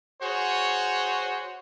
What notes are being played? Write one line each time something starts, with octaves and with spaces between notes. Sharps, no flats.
F#4 G#4 C5 C#5